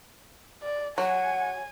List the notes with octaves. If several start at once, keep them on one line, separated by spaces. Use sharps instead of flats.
D5
F#3 F#5 G#5